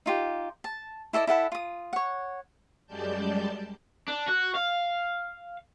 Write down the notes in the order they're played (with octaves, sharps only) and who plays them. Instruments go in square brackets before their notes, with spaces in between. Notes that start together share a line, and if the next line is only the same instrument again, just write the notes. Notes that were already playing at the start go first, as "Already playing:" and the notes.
[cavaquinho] D#4 F4 G4
A5
E4 A4 D5 D#5
E4 A4 F#5 B5
F4 D#6
C#5 F#5
[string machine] F#2 G3 G#3 D5 A5 G6
[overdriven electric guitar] D4
F#4
F5